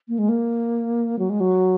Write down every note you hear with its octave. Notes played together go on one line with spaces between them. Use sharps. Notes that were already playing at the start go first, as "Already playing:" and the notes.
A#3
G#3
A#3
F#3
G#3
F#3